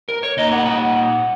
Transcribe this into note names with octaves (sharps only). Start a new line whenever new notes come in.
A#4
C#5
A#2 A#3 D#4 D#5
F#5
F#5